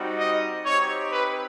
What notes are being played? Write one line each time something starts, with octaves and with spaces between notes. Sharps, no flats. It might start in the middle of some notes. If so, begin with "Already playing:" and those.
Already playing: G3 C4 D#4 F#4
D#5
C4 D#4 G4 C#5
B4